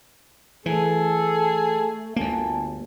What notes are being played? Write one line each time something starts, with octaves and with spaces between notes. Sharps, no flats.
E3 A3 G#4 A4
G1 D2 A#3 G#5 A5